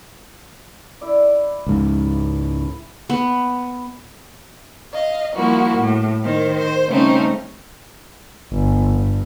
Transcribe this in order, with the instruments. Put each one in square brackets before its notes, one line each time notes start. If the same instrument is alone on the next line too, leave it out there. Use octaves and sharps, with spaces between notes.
[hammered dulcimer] E4 D5
[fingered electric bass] C#2 G#2
[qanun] B3
[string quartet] D#5 F5
F3 G3 A#3 E4 F#4
A2
D#3 C5
C5
C#3 G3 A3 C4 C#4 D#4
[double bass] G1
G2